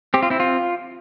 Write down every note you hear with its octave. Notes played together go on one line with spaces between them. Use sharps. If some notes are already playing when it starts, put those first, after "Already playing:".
C4 G4
F4
C4 E4
F4